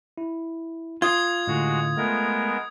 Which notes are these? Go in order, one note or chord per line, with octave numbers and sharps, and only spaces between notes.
E4
F4 D#6 G#6
A2 D3 G#3 F#4
G#3 A3 B3 A#4